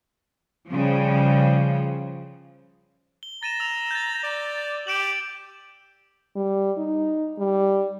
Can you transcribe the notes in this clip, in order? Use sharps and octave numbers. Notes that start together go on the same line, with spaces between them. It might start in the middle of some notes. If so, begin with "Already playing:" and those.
C#3 F3 G3
G7
A#5 A6 D#7 E7
E6 F7
G6 A6
D5
G4 D7 E7 F#7
G3
D#4
G3